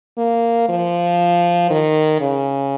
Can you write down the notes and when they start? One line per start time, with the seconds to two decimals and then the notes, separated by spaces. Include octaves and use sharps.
0.18 A#3
0.69 F3
1.70 D#3
2.21 C#3